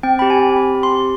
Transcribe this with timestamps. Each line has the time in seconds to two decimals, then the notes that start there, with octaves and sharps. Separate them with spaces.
0.03 C4 G5
0.19 G4 B5
0.30 G#5
0.39 C4
0.56 G4 B5
0.75 C4
0.83 C6
0.93 G4